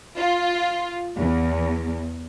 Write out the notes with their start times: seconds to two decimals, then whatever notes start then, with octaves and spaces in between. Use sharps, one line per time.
0.17 F4
1.16 E2